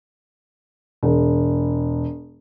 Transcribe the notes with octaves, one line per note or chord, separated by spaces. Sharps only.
E1